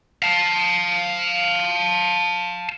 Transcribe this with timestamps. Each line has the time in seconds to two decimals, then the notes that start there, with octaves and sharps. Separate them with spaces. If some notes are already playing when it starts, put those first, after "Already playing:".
0.23 F5 A5